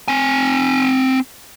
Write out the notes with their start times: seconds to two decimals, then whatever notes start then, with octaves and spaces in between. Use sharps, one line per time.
0.08 C4 G#5